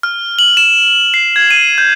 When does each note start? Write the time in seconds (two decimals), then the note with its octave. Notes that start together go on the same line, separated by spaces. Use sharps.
0.03 F6
0.39 F#7
0.57 E7
1.14 C7
1.36 G#6
1.51 D#7
1.78 G6